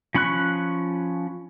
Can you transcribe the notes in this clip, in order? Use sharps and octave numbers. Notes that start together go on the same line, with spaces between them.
F3 C#4 B5 C#6 F#6